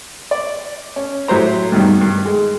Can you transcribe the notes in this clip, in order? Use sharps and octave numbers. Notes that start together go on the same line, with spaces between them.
D5
C#4
A2 F#3 G4 C5 A#5
G2 B2 D#3 G3
G2
G#3